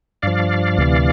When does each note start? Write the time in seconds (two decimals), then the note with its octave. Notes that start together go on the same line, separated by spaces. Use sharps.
0.22 G2 F3 D5 F5
0.78 D2 C3 E3